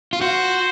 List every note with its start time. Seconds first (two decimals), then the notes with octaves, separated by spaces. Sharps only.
0.13 F4
0.21 F#4 C5